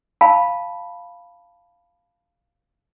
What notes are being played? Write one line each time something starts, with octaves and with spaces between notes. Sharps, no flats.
F5 A5 B5